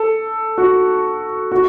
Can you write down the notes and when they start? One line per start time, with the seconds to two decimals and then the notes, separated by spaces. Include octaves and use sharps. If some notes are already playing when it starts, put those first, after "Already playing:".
Already playing: A4
0.58 F#4
1.52 F#4